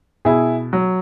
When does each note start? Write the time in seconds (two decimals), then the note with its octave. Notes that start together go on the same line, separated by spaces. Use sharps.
0.25 B2 E4 G#4
0.73 F#3